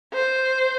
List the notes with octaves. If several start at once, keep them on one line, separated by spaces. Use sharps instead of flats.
C5